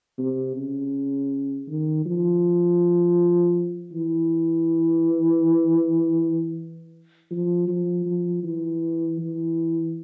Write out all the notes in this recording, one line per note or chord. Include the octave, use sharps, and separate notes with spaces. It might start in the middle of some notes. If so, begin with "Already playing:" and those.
C3
C#3
D#3
F3
E3
F3
F3
F3
E3
E3